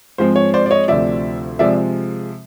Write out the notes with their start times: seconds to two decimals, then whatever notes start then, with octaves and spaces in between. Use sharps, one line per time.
0.18 G#2 F3 G#3 C4 C5
0.36 C#5
0.54 C5 D5
0.66 D5
0.71 C#5 D#5
0.88 D2 C3 F3 D5 E5
1.59 C3 F3 G#3 D5 E5